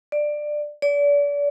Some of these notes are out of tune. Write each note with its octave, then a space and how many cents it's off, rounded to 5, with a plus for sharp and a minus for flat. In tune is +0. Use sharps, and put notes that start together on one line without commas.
D5 +15
D5 -35